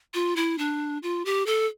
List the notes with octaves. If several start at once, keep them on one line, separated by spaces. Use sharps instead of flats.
F4
E4
D4
F4
G4
A4